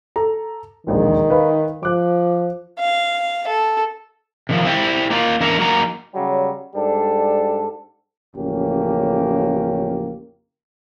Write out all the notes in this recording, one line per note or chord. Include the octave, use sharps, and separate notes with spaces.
A4 A#5
E1 A#1 D#2 D#3
B4 F5 B5
F3 D6 F#6
F5
A4
C3 D#3 F3
C4 E4 G4
A#3 D#4 F4
E2 D4 A#4 E5
F#3 A#3 D#4 A#5
C#3 F#3 G3
G#2 G3 D4 A4
A1 F2 C#3 A#3 C#4 G4